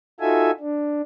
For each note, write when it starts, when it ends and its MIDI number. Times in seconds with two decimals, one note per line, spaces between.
0.20 0.51 63
0.20 0.51 65
0.20 0.51 66
0.20 0.51 69
0.20 0.51 76
0.20 0.51 80
0.60 1.01 62